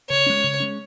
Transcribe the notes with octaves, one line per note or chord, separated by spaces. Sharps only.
C#3 C#5
G#3 C#4
C#3
G#3 C#4